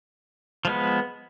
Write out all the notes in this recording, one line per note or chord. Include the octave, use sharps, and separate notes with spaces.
F3 G#3 B3